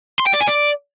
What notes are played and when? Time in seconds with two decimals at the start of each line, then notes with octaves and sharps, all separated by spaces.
0.20 C6
0.27 G5
0.34 D5
0.41 G#5
0.48 D5